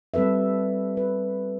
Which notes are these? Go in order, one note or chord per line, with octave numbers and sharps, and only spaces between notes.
G3 C4 A4 B4 E5
B4